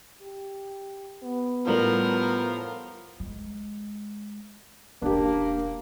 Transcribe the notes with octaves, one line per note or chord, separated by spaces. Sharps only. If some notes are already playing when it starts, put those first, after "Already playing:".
G4
B3
A2 F3 G3 A#4 F#7
G#3
E1 A#3 C#4 D4 G4